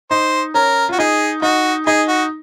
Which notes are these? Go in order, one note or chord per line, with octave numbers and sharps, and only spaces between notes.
D#4 C5
C#4 A#4
F4 F#4
D#4 G#4
D#4 F#4
D#4 G#4
F#4